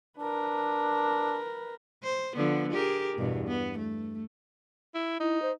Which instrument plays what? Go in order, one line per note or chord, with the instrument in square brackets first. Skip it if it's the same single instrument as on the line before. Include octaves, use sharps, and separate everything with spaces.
[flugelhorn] D4 [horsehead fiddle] A#4 B4
[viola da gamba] C5
D3 F3 B3
G4 G#4 A#4
E2 G2 B2
B3
A3
[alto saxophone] E4
[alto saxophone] D#4 [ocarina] E4
[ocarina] C5